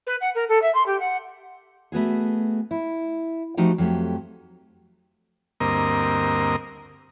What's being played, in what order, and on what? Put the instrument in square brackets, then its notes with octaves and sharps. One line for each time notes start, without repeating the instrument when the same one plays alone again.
[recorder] B4
F#5
A#4
A4
E5
C6
G4
F#5
[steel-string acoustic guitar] A3 B3 F#4 G#4
E4
F3 A3 D#4 F#4 G4
F2 F#3 A3 G4
[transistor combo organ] D2 G2 A#3 C4 A#4 D#5